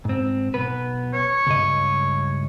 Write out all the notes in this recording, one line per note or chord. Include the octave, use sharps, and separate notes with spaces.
G#2 C4
B1 B3 B4
C#5
C#2 G2 D#5